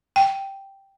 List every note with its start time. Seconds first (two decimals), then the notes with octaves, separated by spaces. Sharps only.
0.16 G5